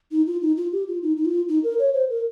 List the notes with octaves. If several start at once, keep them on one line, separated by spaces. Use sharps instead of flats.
D#4
F4
D#4
F4
G4
F4
D#4
D#4
F4
D#4
A#4
C#5
C5
A#4